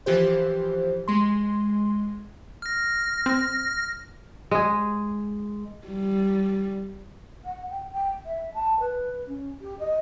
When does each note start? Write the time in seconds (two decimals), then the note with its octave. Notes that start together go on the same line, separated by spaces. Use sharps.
0.06 E3 F3 G4 C5
1.08 G#3 C6
2.62 F6 A#6
3.26 C4
4.51 G#3 G#4
5.87 G3
7.45 F#5
7.70 G5
7.92 G5
8.26 E5
8.54 A5
8.80 B4
9.27 C#4
9.61 G4
9.79 D#5